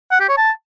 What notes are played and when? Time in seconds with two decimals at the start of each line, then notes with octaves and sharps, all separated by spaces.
0.11 F#5
0.20 G4
0.29 C#5
0.37 A5